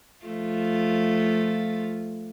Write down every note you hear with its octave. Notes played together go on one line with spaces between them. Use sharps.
F3 A3 F4